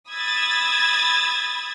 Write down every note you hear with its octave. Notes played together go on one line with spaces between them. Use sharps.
B5 D#6 E6 G#6 A6